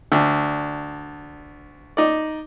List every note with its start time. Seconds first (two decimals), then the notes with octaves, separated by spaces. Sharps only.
0.12 D2 D4
1.97 D#4 D5